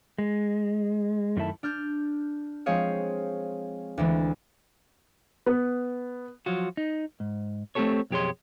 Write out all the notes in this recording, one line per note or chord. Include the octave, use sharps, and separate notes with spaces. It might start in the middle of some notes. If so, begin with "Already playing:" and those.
G#3
F#2 D#3 A3 E4 A5
D4 F6 G6
F3 G#3 C4 G#4 C#5 F5
D2 D3 E3 G#3
B3
F3 F#3 F4 F#4
D#4
G#2
A3 C4 D4 G4 A4 C#5
B1 F2 G4 G#4 C#5 C6